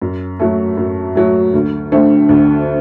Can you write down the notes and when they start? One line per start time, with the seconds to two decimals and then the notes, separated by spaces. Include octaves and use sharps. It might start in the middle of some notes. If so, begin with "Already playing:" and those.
0.02 F#2
0.40 F#3 A3
0.77 F#2
1.15 F#3 A3
1.53 D2
1.92 D3 A3 C4
2.29 D2